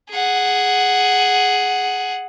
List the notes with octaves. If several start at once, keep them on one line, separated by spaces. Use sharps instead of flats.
G#4 F#5